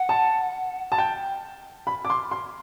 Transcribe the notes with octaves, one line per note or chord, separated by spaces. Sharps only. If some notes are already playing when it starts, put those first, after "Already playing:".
Already playing: F#5
A5
A5
G5
B5
D6
C6
C6